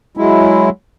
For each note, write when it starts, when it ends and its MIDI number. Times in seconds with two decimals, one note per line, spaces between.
0.17 0.69 54
0.17 0.69 56
0.17 0.69 64